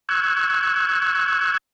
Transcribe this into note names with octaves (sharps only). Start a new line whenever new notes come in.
C#6 E6 F#6 G#6